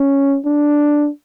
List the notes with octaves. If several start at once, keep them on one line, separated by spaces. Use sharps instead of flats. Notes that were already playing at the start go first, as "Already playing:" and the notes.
Already playing: C#4
D4